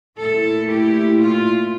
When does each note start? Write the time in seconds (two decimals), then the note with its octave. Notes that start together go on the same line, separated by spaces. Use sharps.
0.18 A#2 A3 E4 A4
0.70 G4
1.21 F4